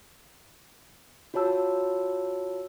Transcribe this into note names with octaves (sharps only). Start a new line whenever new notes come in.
F4 F#4 C#5 A5 E6